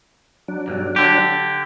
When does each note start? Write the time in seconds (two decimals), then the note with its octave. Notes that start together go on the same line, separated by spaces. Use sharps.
0.48 F#3 D4
0.68 B1 G2
0.96 D3 G4